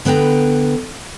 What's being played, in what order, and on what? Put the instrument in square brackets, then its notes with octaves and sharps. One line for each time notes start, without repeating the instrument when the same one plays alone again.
[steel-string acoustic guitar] D3 B3 B4 G5 A#5